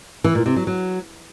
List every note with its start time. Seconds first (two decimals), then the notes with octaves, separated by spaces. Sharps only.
0.24 E3
0.35 A#2
0.46 C3
0.56 F#3
0.67 F#3